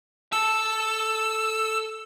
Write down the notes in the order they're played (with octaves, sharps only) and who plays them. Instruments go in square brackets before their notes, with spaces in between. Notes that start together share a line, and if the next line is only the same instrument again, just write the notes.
[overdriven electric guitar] A4 A5 [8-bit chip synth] E6